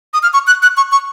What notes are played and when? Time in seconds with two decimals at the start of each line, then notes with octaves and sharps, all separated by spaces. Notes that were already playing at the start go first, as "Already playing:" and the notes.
0.14 D#6
0.23 F6
0.34 C#6
0.47 F#6
0.62 F#6
0.77 C#6
0.92 C#6